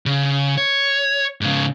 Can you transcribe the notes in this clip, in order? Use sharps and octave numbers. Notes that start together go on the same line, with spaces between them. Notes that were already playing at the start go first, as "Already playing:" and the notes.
C#3
C#5
G#2 C#3